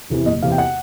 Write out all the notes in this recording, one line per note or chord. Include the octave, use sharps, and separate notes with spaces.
E2 C3 E3
F#1 D#5
E2 C3 E3 F5
G5
F#5